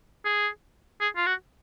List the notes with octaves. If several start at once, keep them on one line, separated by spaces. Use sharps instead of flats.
G#4
G#4
F4
F#4